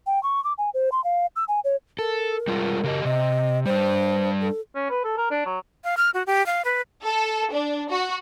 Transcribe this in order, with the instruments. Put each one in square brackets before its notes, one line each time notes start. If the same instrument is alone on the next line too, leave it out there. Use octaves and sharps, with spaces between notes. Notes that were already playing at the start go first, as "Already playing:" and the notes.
[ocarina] G5
C#6
D6
G#5
C5
C6
F5
E6
G#5
C#5
[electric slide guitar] A4 [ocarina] A#4
[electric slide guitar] G3 G#3 F4
C#3 G4 D#5
[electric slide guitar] C3 [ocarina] D#5
[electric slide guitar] G3 D4 [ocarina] C5
[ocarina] A4
[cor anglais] C#4
B4
A4
A#4
D4
F#3
[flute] F5
F6
F#4
G4
F5
B4
[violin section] A4
D4
F#4